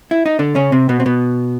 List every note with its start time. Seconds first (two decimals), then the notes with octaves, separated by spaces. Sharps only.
0.11 E4
0.26 D#4
0.39 D3 D4
0.55 C#3 C#4
0.72 C3 C4
0.89 B2 B3
1.00 C4
1.06 B2 B3